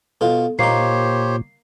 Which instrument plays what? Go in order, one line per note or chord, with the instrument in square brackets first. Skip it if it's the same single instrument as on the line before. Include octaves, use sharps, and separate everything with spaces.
[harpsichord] B2 F4 [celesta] A4
[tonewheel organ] A#2 [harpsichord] A#3 D#4 [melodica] G4 C5 C#5 [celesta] C7